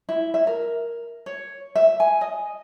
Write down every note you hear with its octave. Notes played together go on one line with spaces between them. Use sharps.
E4
E5
A#4
C#5
E5
G#5
D#5